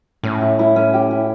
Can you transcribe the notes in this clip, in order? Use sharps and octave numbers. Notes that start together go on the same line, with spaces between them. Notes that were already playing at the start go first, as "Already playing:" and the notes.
A2 C#4
E4
E4
C#4
G4
E4